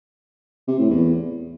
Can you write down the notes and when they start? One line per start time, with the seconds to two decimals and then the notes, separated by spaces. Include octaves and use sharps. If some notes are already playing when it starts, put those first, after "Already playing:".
0.68 C3
0.79 A2
0.90 E2